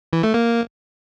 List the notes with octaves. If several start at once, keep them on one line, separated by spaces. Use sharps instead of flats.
E3
A3
A#3